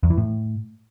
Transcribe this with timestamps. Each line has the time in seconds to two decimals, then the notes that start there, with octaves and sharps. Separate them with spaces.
0.03 E2
0.10 E3
0.17 A2